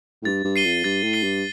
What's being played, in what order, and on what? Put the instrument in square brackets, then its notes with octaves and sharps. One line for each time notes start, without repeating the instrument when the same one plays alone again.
[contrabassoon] A2
[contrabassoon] G2 [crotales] A6
[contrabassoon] G2
[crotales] C7 D#7 G7
[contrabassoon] F2
[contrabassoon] G2 [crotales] A6
[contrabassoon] A2
[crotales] C7 D#7 G7
[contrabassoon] G2